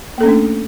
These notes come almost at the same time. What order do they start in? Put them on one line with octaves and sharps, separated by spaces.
A#3 A4 C#4 A3 D4